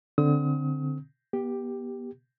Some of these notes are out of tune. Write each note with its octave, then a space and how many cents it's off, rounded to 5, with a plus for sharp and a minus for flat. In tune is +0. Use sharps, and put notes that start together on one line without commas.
D3 +0 C4 +0 D#6 +40
B3 -35 G4 +5